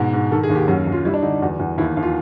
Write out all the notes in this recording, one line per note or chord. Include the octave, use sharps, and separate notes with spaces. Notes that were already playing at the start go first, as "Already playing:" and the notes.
Already playing: G#2 B2
G#2
D#3 A4
G#4
D#2
G4
F#2 F#4
F#2
F4
G3 E4
D4
D3 D#4
E2 F#4
E2
D#2 E4
D#2
F4